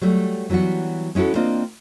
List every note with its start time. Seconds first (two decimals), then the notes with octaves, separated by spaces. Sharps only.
0.01 F#3 G3 A3
0.50 E3 F#3 G3 B3 F#4
1.15 G#3 C#4 E4 F#4 A4
1.35 A#3 C4 D4 F4 D#5